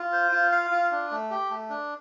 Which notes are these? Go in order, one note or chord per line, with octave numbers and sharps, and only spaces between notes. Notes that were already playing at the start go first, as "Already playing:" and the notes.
Already playing: F4
C5
F4
F5
F4
D4
A3
G4
A3
D4